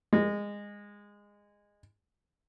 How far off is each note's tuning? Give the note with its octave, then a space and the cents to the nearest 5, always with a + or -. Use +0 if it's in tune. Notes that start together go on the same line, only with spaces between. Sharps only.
G#3 -20